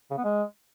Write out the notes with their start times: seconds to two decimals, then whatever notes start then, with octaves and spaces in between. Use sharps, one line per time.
0.11 C#3
0.17 B3
0.24 G#3